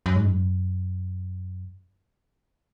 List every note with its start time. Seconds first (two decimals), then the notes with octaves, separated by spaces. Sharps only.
0.06 F#2
0.16 G#2
0.26 F#2